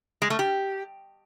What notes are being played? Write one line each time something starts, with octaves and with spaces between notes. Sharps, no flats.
G#3
A3
G4